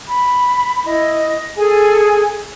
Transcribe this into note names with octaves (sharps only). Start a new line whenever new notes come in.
B5
E4 D#5
G#4 A4 G#5